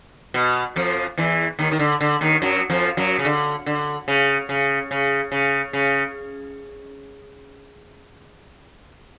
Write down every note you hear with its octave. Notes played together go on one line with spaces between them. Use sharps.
B2
F2 F3
E2 E3
D#2 D#3
D#3
D3
D3
D#2 D#3
F#2 F#3
F2 F3
F#2 F#3
C#3
D3
D3
C#3
C#3
C#3
C#3
C#3